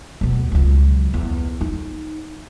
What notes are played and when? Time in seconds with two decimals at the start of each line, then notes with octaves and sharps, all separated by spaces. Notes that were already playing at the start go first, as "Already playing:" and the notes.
0.21 D2 B2
0.52 C#2 F#3
1.14 E2
1.61 D#4